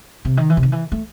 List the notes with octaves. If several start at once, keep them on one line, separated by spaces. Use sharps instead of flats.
C3
D#3
E3
C3
D#3
E3
A3